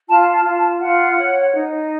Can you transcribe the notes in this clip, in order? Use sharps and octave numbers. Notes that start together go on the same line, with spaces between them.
F4 A5
A5
F4
A5
F4 F#5
C#5
D#4